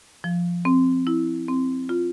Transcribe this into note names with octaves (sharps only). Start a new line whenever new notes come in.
F3
C4
E4
C4
F4